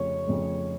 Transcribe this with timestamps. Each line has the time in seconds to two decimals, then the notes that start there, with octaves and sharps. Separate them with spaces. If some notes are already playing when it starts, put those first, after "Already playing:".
Already playing: F1 F2 C#3 C#5
0.27 F1 F2 C#3